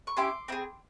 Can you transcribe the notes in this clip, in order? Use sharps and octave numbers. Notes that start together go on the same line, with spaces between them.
C#6
C#4 E4 G4 C6 D6
C4 E4 G#4